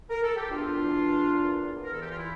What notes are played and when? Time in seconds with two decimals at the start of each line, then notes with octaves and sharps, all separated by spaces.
0.10 A#4
0.23 A4
0.36 G4
0.50 E2 D4 F4
0.78 E3
1.06 E2
1.34 A#3
1.62 E2
1.85 A#4
1.91 E3 A4
2.01 G4
2.10 F4
2.18 E4